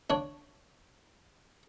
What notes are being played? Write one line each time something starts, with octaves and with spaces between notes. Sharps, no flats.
D4 C#5